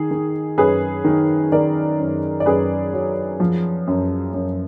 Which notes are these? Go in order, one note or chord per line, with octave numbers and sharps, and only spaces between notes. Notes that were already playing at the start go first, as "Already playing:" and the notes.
Already playing: D#3 G#4
D#3
F#2 G#4 B4
D#3
D#3 A#4 D5
F#2
D5
F#2 G#4 B4
F#3
F3
F#2
F#2